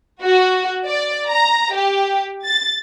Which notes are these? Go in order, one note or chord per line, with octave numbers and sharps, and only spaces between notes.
F#4
D5
A#5
G4
A6